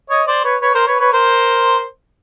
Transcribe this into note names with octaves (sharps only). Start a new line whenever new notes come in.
C#5 D#5
C5 D5
B4 C#5
B4 C#5
A#4 C5
B4 C#5
B4 C#5
A#4 C5